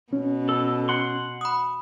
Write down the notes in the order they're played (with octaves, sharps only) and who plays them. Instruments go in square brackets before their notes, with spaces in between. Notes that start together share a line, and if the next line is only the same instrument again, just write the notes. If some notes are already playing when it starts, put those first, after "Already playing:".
[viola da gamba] B2 [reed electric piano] C#4
[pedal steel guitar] A4
F#5 C6
[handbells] B5 D#6